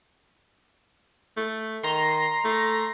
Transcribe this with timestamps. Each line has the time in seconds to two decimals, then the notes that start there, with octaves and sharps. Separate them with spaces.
1.37 A3
1.83 D#3 A#5 C6
2.45 A3